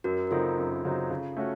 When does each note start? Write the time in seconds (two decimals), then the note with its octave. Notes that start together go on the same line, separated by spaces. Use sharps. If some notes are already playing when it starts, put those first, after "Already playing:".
0.04 F#2 F#4 A#4
0.27 A#4
0.31 C#3 F#3 C4 D#4 F4 A4
0.58 F#2
0.84 C#3 F#3 C4 D#4
1.10 C#3
1.37 A3 C#4 F#4